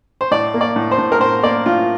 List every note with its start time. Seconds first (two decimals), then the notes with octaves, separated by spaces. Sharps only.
0.21 C5
0.31 A2 D5
0.54 A#3
0.61 D5
0.76 A2
0.91 C5
0.98 A2
1.12 A#4
1.20 A2 C5
1.43 A#3 D5
1.66 A2 F4